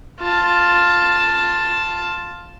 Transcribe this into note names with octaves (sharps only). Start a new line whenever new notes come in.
F4 A5